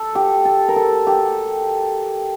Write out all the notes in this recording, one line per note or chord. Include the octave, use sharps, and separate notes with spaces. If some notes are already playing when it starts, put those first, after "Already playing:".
Already playing: A4
G4
A4
A#4
A4
G4